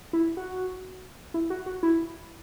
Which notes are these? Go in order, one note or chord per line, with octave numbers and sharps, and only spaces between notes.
E4
F#4
E4
F#4
F#4
E4